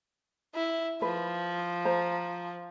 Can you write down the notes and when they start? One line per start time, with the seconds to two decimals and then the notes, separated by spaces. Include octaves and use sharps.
0.55 E4
1.02 F3 B4
1.85 C5 A#5